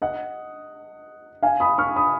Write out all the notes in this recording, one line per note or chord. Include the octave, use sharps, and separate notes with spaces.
D#5 F#5
F5 G#5
B5 D#6
C#6 F6
B5 D#6